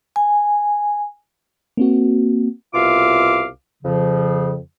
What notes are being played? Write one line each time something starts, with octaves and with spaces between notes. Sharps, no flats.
G#5
A#3 C4 F#4
C2 B2 F4 E5 F5 D6
F2 C#3 F3